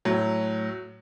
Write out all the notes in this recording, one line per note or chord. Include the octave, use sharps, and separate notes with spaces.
A2 F#3